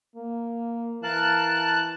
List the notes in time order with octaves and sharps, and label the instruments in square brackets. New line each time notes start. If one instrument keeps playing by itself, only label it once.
[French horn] A#3
[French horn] E3 [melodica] A#4 F5 [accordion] A5 F#6